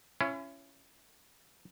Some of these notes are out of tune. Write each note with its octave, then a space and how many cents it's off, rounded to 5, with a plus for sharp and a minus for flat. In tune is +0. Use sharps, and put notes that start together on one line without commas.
C#4 +0 E4 +35